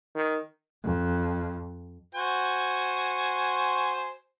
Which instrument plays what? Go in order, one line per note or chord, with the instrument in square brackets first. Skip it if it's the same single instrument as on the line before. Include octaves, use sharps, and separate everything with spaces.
[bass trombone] D#3
[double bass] F2
[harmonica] F#4 C5 G#5